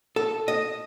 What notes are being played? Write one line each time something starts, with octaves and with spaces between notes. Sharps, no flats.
A4
D#5